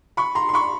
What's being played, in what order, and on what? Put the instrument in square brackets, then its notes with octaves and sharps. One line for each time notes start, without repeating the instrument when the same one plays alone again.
[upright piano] B5 C#6
A#5 C6
C6
B5 C#6